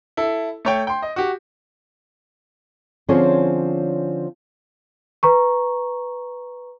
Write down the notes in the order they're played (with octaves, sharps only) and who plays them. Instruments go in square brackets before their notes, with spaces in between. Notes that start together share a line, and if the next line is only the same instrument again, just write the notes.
[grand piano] E4 A4
A3 C#5 G5
G5 C6
D#5
F#4 G4
[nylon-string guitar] D3 F3 C4 C#4 G#4 C#5
[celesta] B4 A#5 C#6